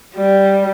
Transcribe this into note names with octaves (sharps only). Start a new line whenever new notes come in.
G3